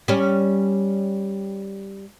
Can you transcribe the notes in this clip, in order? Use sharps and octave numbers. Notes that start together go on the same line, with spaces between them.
G3 C#4